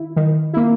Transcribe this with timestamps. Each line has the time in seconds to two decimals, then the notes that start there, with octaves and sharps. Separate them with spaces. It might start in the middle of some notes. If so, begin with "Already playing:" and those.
Already playing: D#3 E4
0.16 D#3
0.53 A#3 E4